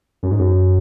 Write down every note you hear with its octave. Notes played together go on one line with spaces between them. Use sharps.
F#2
G#2
F#2